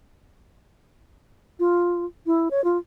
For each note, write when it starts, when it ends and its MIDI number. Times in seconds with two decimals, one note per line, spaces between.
1.59 2.05 65
2.26 2.49 64
2.51 2.64 73
2.64 2.78 65